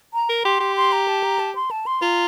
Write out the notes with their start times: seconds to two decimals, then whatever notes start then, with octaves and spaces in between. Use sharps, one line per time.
0.14 A#5
0.29 A#4
0.45 G4 C6
0.60 G4
0.77 C6
0.92 A#5
1.08 A5
1.24 A#5
1.39 A5
1.55 C6
1.71 A5
1.87 C6
2.02 F4 A#5